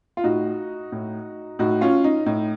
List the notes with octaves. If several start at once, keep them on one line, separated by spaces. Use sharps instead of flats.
F4
A2 D#4 F#4
A2
A2 D#4 F#4
C#4 F4
D#4
A2 D#4